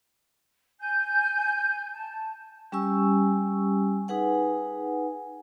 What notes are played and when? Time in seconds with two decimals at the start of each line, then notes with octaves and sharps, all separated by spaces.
0.80 G#5 G6
1.93 A5
2.72 G3 C#4 G4 G#5 C#6 E6
4.08 D#4 G#4 B4 F#5 G#5